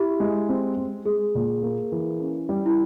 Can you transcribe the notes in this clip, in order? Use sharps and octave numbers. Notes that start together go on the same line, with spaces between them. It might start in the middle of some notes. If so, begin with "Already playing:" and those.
Already playing: E4 G4
G#3
C4
G#3
G#3 G#4
A#2
A#3
E3
C#4
G3
E4